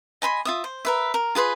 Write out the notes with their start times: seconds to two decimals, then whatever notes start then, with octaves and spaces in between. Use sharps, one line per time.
0.22 D#5 G#5 B5 C6
0.45 F4 E5 D#6
0.64 C5
0.85 A#4 B4 E5
1.14 A#4
1.35 F4 G#4 B4 C6